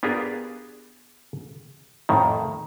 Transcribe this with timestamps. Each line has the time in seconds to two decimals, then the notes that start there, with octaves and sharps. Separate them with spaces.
0.03 B3 D4 F4 G4 G#4 A#4
2.09 F2 A2 D#3